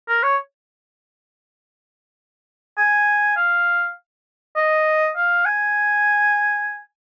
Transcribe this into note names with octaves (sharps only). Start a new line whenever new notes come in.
A#4
C#5
G#5
F5
D#5
F5
G#5